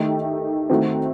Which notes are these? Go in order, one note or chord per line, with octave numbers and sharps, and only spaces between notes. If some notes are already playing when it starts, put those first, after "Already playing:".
Already playing: D#3 A3 D#4 G4
D#3 A3 C4 F#4